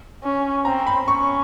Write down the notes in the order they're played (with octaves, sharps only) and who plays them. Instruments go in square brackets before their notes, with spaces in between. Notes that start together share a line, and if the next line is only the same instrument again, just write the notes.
[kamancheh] C#4
[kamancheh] C4 [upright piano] A#5
[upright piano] B5
[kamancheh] C#4 [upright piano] C#6